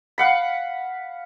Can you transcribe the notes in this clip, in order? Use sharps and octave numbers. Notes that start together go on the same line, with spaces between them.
F5 F#5 B5